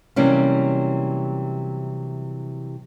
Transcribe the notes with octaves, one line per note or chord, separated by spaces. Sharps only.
C3 E3 F#3 G3 A#3 C#4